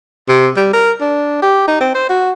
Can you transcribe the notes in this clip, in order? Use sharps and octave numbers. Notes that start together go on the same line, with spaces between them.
C3
G3
A#4
D4
G4
D#4
C4
C5
F#4